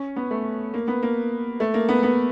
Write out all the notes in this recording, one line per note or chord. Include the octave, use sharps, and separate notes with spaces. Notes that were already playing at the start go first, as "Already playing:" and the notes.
Already playing: C#4
B3
A3
A#3
B3
A#3
A3
A#3
B3
B3